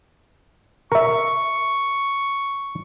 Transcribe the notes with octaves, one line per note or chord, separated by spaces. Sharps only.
A#4 E5 C#6